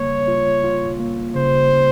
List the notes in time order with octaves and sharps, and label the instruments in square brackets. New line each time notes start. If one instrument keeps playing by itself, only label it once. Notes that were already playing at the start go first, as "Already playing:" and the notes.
Already playing: [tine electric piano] C#3 G3 A#3 [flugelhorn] C#5
[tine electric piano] F4
F4
A#3
[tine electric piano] C#3 [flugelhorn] C5
[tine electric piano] C#3